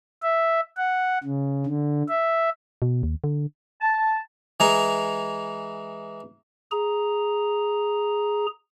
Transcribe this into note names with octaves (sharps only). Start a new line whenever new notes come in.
E5
F#5
C#3
D3
E5
B2
D#2
D3
A5
E3 G#3 G#4 A#5
G#4 A#5